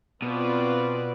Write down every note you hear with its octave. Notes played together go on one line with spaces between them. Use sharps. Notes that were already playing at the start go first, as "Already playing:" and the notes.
B2 C4 F4 B4 D5